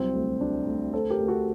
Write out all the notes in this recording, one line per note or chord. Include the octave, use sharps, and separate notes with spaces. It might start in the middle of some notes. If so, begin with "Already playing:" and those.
Already playing: C2 F#3 C4
D2
D2 D4
D2
D2 A4 C5
G4 A#4
D2
F#4 A4